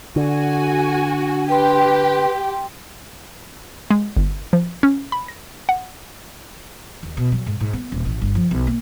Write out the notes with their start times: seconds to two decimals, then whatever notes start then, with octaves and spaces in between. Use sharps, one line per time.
0.16 D3 F#4 G#5
1.49 G4 B4 G5 C6
3.91 G#3
4.17 G1
4.53 F3
4.83 C#4
5.12 B5
5.28 A#6
5.69 F#5
7.03 D#2
7.17 B2
7.32 F#3
7.46 G#2
7.60 G#2
7.73 B3
7.92 D#1
8.05 A1
8.22 G1
8.35 F3
8.51 B1
8.67 A#3